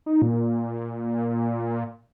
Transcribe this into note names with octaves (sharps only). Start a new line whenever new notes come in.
D#4
A#2